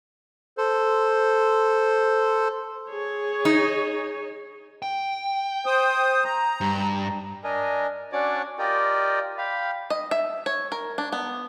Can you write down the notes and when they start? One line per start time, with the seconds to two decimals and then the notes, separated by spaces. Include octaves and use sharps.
0.57 A4 C5
2.90 G#4 C#5
3.45 D#4
4.82 G5
5.66 C5 D#6
6.24 A#5
6.61 G2
7.44 D4 A#4 D#5 G#5
8.13 C#4 D4 F#4 C#5 D5 D6
8.59 F4 G4 A#4 D5 D#5 G5
9.38 F5 G5 B5
9.90 D#5
10.11 E5
10.46 C#5
10.72 A#4
10.98 D4
11.12 B3